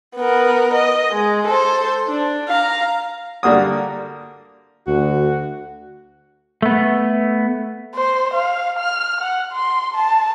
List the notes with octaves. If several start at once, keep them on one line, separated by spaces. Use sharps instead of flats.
B3 A#4
D#5
G#3
A4 C5
D4
F5 A#5
D3 G3 A#3 F#4 D#6
D2 F#4
A3 B3
C5
F5
F6
F#5
C6
A5